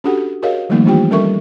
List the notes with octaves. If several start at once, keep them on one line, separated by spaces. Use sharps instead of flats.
C#4 D4 F#4 G4 A4 F#5
F#4 G#4 A#4 C#5 D#5 F5
D#3 F3 G3 A3 A#3 D#4
E3 D4 F4 G4 G5
G3 C#4 A4 A#4 E5 C#6